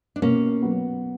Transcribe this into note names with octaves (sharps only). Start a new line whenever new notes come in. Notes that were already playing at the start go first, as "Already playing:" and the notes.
D4
B2 A#3 C#4
F#3 B3